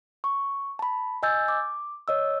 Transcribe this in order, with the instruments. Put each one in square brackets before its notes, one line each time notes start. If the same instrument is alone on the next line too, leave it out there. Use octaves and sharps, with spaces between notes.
[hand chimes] C#6
A5 B5
D#5 G#5 E6 G6 A6
D6
C#5 D#5 E6